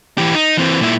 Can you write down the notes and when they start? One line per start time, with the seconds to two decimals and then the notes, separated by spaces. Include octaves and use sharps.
0.18 E3 G4
0.35 D#4
0.57 E3 C4
0.81 A#2 E4